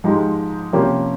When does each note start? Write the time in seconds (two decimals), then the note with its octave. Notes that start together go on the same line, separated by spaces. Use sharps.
0.04 G#2 F3 G#3 D#4 G4
0.73 C3 F3 A#3 C#4 G4